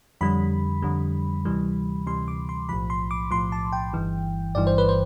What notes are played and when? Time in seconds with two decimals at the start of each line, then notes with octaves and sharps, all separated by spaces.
0.21 F2 D3 G3 B5
0.82 F2 D3 G3
1.45 D2 C3 E3 G3
2.07 D2 C3 E3 G3 C6
2.28 D6
2.49 C6
2.69 B1 A2 F3 B5
2.90 C6
3.11 D6
3.31 B1 A2 F3 C6
3.52 A5
3.73 G5
3.93 G1 G2 E3
4.55 G1 G2 E3 D5
4.67 C5
4.78 B4
4.89 C5